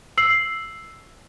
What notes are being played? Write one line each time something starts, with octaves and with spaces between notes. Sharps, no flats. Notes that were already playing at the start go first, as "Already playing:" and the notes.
E6 C7 F#7